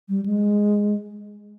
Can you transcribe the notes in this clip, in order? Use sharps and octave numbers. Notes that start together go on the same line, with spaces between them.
G3
G#3